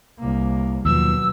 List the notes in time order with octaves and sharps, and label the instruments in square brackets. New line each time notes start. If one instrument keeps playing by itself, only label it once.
[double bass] C2 A#3
[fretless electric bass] D#2 F3 [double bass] B2 F#3 [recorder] E6